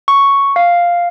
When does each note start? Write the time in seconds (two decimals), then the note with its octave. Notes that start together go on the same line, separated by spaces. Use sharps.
0.08 C#6
0.56 F5